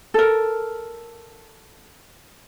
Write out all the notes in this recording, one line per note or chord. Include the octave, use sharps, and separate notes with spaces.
A4 A#4